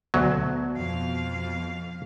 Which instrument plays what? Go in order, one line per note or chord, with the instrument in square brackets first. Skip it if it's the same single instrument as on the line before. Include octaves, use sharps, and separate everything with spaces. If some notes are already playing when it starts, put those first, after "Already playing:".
[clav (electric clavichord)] D2 F#3 [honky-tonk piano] B2
[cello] F2 F5